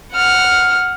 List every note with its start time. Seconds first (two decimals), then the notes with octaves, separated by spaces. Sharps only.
0.13 F#5 F6